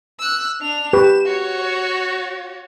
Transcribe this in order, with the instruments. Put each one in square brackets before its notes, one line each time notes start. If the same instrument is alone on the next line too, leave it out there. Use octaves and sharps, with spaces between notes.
[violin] E6 F#6
D4 F7
[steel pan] G4 B4 [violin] E7
[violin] F#4 C#5